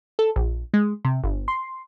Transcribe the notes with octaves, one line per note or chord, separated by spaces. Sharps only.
A4
A#1
G#3
C3
G1
C6